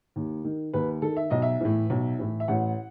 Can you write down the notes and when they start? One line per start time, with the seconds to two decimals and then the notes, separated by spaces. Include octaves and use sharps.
0.16 D#2
0.44 D#3
0.73 D#2 B4
1.02 D#3 A4
1.17 E5
1.30 B1 D#5
1.42 E5
1.61 A2 E3
1.90 B1
2.19 A2 E3
2.40 E5
2.48 A1 F#5